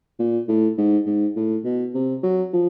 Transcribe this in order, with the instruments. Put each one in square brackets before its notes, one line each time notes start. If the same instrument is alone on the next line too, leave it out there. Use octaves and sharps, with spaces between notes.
[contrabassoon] A#2
A2
G#2
G#2
A2
B2
C3
F#3
F3